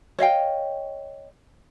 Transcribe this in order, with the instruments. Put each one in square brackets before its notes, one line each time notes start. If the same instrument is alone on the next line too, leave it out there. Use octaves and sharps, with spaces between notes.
[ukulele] C#5 D#5 F5 G5